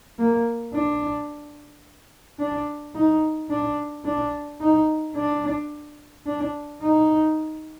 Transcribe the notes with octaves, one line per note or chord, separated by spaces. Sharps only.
A#3
D4
D4
D#4
D4
D4
D#4
D4
D4
D#4